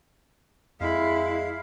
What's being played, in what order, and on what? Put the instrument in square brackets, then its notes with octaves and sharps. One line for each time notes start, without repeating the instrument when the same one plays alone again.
[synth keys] F2 B5 [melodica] G#3 F5 [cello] E4